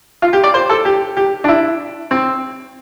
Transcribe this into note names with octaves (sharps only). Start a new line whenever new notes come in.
F4
G4
D5
C5
A4
G4
G4
D4
E4
C4